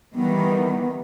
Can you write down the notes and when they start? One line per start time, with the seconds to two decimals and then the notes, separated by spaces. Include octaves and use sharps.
0.15 D#3 E3 G3 B3